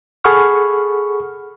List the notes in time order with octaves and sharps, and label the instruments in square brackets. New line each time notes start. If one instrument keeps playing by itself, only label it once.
[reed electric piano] G#4 A4 F#5 B5 C#6 F6